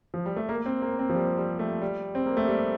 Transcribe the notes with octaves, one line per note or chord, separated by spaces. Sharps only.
F3
G3
A3
A#3
C4
A#3
C4
F3
G3
G3
A3
G3
C4
A#3
A3
G3